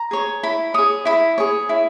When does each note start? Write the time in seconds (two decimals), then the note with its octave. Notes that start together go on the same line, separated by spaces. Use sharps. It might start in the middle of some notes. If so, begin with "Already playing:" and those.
Already playing: A#5
0.11 G#4 C#5
0.43 E4 B5
0.74 G#4 C#5 D#6
1.05 E4 B5
1.38 G#4 C#5
1.69 E4